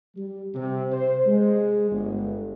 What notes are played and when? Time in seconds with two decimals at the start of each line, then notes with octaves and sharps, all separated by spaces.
0.16 G3
0.54 C3
0.92 C5
1.26 G#3
1.91 G1